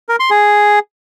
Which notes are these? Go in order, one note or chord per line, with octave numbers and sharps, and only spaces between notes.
A#4
C6
G#4